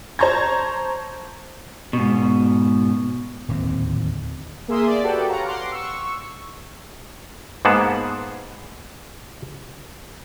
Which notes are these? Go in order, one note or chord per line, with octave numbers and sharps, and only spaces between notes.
C5 A5 A#5 C#6 G6 G#6
G#2 B2
D1 D#2 A#2 C4
A#3 G#4 E5 C6 D#6
D5
F#4 G4 A4 B4 D5 G5
C#5 F5 F#5 A#5
F#5 C6 D6 F6
C#6 E6
G#2 A#3 B3 G#4 F#5 A5